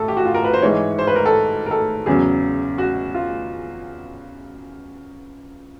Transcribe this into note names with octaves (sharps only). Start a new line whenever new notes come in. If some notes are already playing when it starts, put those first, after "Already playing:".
Already playing: A2 A4
G4
F#4
F4
A#4
B4
C5
G#2 E3 G#3 C#5
C5
B4
A#4
A4
A#4
A4
E2 C#3 F#3 G#4
F#4
F4